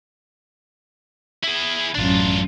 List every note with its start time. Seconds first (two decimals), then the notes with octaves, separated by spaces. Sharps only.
1.44 E4 G#4
1.95 A1 F#2 D4 F4